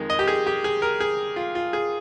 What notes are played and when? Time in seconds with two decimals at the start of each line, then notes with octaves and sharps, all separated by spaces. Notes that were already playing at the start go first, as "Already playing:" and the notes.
Already playing: F2 D#3 G#3
0.10 D#5
0.19 G4
0.28 G#4
0.47 G4
0.64 G#4
0.82 A#4
1.00 G#4
1.36 F4
1.55 F4
1.73 G#4